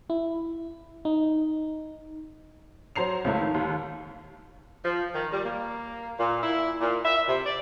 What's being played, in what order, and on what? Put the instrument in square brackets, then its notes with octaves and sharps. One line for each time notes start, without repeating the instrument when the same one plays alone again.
[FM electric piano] E4
D#4
[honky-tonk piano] F#3 C5 A#5 C7 F7
C#2 A2 A3
D#3
D#2
[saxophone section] F3
D#3
G3
A#3
A#2
E4
A#2
E5
C3
D5